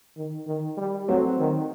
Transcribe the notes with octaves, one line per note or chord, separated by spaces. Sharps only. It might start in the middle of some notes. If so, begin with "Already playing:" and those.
D#3
D#3
G3
F#3 A3 C4
D#3